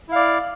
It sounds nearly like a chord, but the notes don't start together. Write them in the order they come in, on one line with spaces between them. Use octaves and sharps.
E4 F5 D5